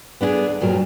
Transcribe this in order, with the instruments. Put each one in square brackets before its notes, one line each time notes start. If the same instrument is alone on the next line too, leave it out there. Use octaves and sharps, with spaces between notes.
[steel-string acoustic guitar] B3 D4 E4 G#4
D2
G2 A#2 F#3 G3 A#4